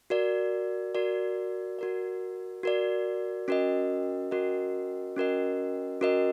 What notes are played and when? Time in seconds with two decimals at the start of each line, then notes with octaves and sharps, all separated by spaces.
0.10 F#4 A#4 D5
0.95 F#4 A#4 D5
1.79 F#4 A#4 D5
2.63 F#4 A#4 D5
3.48 C#4 F#4 A#4 D#5
4.31 C#4 F#4 A#4 D#5
5.16 C#4 F#4 A#4 D#5
6.01 C#4 F#4 A#4 D#5